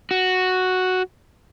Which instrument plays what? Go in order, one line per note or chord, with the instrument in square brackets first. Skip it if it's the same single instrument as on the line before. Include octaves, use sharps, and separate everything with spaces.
[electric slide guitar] F#4